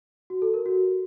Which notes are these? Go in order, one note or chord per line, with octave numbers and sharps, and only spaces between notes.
F#4
A4
A#4
F#4